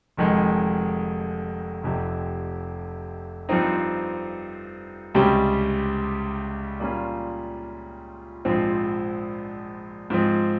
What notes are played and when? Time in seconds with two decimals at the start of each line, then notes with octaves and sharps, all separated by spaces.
0.17 F1 F2 D#3 G#3
1.83 F1 F2 C3
3.49 G2 F3 C4 D#4
5.14 C#2 C3 G3 C#4 G4
6.80 A#2 G3 A#3 C#4 F4
8.45 A#1 G#2 F3 C4
10.10 G#2 F3 C4